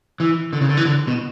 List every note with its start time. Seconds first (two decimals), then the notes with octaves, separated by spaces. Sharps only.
0.20 E3
0.53 D3
0.61 C#3
0.69 D3
0.77 E3
0.86 D3
1.07 B2